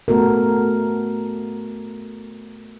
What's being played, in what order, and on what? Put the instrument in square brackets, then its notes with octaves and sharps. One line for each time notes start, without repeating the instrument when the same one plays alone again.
[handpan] A3 B3 F#4 A4 A#4